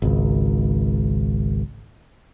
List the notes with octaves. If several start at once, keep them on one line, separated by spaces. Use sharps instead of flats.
G#1 C#2